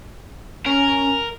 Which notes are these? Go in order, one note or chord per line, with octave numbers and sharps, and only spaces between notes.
C#4 A#4